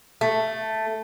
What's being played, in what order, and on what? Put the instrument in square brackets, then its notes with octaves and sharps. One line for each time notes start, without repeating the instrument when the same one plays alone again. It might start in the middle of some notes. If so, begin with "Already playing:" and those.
[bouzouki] A3